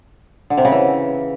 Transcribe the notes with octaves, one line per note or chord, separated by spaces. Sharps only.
D3
C3
C#3
E3